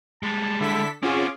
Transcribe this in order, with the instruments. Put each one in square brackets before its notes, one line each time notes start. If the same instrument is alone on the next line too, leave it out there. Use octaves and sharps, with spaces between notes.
[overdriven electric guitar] G3 G#3 [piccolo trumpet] A5
[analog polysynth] D3 A4 B6 [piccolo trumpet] E4
[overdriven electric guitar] C4 F#4 [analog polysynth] C#4 F4 G#4 [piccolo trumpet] D6